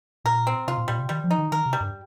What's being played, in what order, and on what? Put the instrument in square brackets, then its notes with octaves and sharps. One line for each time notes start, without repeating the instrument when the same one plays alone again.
[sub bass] A#2 [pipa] A#4
[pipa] C4
[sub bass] C3 [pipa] F4
[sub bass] A#2
[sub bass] A#2 [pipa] G3
[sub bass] C3
[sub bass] D#3 [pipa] G3
[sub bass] F3
[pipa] D#4
[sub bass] D#3
[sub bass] D#3 [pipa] A#4
[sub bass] C3
[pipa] G3
[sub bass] G2